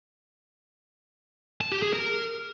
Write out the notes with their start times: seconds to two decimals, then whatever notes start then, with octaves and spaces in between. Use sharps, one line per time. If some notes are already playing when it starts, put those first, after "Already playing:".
1.61 A5
1.72 G4
1.83 G#4
1.93 A#4